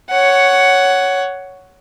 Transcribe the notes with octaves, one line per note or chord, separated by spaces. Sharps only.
C#5 F#5